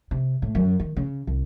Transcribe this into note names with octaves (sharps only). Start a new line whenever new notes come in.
C3
A2
F#2
D#3
C#3
C2